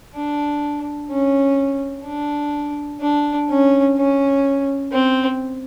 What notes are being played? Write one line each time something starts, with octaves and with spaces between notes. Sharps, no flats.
D4
C#4
D4
D4
C#4
C#4
C4